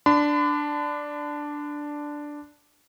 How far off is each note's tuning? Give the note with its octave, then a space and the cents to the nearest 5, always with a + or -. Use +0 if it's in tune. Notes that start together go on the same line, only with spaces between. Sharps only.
D4 +0 B5 +45